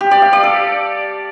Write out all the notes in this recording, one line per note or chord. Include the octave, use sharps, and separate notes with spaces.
G4
D5
F5
D5
A4